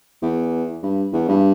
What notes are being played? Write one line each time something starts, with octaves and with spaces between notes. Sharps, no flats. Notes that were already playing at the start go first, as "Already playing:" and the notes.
E2
G2
E2
G2